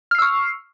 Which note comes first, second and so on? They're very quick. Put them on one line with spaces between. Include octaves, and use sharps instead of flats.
F6 C7 E6 C#6